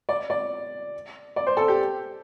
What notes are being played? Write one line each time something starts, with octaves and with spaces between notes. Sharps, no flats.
D5
D5
D5
C5
A4
G4